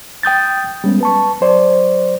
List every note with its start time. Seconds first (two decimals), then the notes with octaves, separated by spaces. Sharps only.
0.23 G5 D#6 G6 A6
0.84 G3 G#3 B3 C#4
1.01 B4 A5 C#6
1.41 F#3 C5 D5